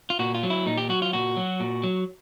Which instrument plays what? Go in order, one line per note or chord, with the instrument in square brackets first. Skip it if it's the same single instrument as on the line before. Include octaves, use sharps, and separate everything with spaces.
[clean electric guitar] F4
A#2 F#4
F4
F#3
E4
A#2 D#4
G4
F#3 F#4
F4
A#2 F#4
F#3
A#2
F#3